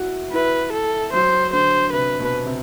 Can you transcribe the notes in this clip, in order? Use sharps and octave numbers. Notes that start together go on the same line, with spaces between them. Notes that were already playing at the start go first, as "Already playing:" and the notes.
Already playing: E4 F#4
E4 B4
A4
F#3 C5
D3 C5
C3 B4
B2
C3